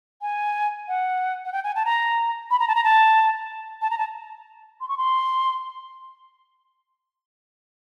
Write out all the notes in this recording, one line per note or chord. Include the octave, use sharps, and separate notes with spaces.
G#5
F#5
F#5
G5
G#5
A5
A#5
B5
A#5
A5
A#5
A5
A5
A#5
A5
C6
C#6
C6